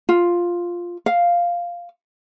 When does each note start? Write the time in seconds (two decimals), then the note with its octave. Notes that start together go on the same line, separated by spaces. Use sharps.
0.09 F4
1.06 F5